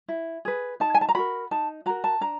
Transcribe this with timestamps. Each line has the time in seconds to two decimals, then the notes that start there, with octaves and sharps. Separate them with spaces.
0.08 E4
0.45 G#4 B4
0.80 D#4 A5
0.94 G#5
1.01 A5
1.09 A#5
1.15 F#4 A#4 B5
1.51 D#4 A5
1.86 F#4 A#4 A#5
2.04 A5
2.21 D4 A#5